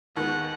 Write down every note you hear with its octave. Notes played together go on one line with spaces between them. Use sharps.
D#2 D#3 G#3 B3 F#5